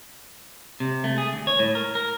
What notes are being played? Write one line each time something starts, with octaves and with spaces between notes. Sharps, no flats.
C3
A3
G#4
D2
C#5
A2
A#4
A#4